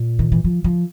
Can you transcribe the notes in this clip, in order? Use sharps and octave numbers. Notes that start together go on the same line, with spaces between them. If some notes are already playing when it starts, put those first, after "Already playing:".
Already playing: A#2
D#3
E3
F3
F3